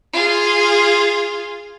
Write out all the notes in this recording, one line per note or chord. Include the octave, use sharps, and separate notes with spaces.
F4 G#4